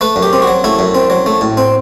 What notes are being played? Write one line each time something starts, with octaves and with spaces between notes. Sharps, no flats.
A3 B4
F#2
G4
C4
F#4
F#3
A3 E4
F#2
C4
F#3
A3
A2
C4